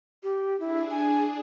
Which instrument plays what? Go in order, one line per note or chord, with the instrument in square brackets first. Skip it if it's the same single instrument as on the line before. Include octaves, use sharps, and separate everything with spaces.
[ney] G4
[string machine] D4 G#4 [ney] E4
[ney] G#5